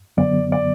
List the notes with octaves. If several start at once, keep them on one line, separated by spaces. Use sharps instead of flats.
F#2 D3 F#3 B3 D5
D5